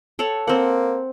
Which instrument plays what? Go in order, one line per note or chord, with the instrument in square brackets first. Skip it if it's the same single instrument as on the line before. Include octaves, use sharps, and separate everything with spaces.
[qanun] A4 C#5 F#5
[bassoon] A#3 [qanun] C4 F#5